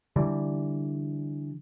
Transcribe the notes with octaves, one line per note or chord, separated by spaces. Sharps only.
D3 E3 G3